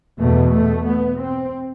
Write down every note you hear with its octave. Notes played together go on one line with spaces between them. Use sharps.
E2 B2 A3
A3
B3
C4